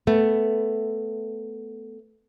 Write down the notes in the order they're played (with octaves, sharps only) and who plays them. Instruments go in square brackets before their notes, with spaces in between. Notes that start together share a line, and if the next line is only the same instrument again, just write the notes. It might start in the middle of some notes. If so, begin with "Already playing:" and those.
[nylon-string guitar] A3 B3